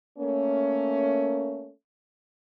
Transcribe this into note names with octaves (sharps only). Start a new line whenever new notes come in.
A3 A#3 C#4